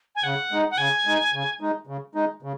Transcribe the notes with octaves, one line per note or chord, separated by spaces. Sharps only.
G#5
C#3 F#5
G#3 D#4
F#5
C#3 G#5
G#3 D#4
C#3
G#3 D#4
C#3
G#3 D#4
C#3